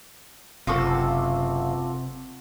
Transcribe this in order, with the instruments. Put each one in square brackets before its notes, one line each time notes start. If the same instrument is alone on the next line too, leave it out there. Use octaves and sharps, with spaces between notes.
[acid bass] F#1 [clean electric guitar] C3 C4 [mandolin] F4 F#4 A4